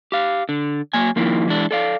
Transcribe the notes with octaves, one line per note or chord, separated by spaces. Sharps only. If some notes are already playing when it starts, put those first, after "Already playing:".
G4 F5
D3
F#3 A#3 G#5
D#3 F3 A#3 D#4 E4
E3 G#3 D4
A4 D5 F5